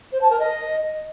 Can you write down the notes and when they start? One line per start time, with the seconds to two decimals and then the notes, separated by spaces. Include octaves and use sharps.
0.12 C5
0.21 A5
0.30 A#4
0.40 D#5